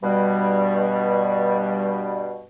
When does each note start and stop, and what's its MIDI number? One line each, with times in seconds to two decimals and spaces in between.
0.03 2.44 43
0.03 2.44 47
0.03 2.44 55